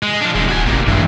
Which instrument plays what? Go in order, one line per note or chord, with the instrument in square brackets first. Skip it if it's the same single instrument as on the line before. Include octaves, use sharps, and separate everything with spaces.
[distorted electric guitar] G#3
F3 D4
[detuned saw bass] E1 [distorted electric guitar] C3 G#3
[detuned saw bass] D1 [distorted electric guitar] F#4 G#5
[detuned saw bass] A1 [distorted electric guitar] C3 A#3
[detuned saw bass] G2 [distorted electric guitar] E3 G#3